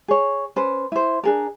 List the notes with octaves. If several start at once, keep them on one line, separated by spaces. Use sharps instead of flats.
G#4 C#5
C#4 B4 C5
E4 C5
D4 G#4 A#4